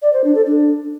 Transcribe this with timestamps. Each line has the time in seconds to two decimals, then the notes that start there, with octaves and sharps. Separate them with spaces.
0.02 D5
0.13 C5
0.24 D4
0.35 A4
0.46 D4